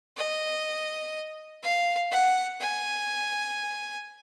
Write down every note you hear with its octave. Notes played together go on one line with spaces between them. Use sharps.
D#5
F5
F#5
G#5